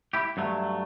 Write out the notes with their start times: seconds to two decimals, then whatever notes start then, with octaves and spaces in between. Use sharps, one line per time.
0.13 E4 G4
0.37 G2 F#3 A3